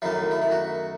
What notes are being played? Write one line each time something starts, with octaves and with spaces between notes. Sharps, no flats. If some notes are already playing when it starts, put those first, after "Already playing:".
F#2 D#3 A3 E4
E4
E4
F#4